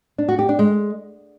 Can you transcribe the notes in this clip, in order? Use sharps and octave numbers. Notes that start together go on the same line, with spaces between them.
D4
F#4
G4
D4
G#3